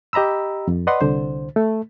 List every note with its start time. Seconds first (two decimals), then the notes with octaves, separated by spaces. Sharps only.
0.13 G4 D#5 A#5 B5 E6
0.68 F2
0.87 B4 D5 D#5 F#5 C6
1.01 C2 D3 C5
1.56 A3